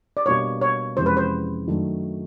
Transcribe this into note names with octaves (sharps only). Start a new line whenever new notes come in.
D5
B2 G3 A#3 D4 C#5
C#5
F2 C3 E3 G#3 C#4 C5
B4
C5
F#2 D#3 F#3 A3 D4